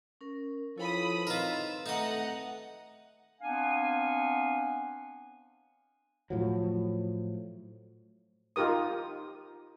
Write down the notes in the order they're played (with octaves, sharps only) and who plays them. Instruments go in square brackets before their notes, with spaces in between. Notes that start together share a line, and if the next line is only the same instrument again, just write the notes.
[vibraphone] C#4 A#4
[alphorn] F3 [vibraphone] E4 A4 C#5 [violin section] B4 B5 D#6
[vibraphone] C4 B4 [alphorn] D#4 [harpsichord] F4 A#4 [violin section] E6
[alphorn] A3 [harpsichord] D#4 D#6 [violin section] D#5 F#5 A#5
[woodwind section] B3 C4 D4 F5 F#5 G#5
[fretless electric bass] A2 F3 F#3
[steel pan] D#4 F4 G4 A#4 D#6